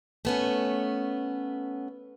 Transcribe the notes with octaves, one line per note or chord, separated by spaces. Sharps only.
A3 B3 C#4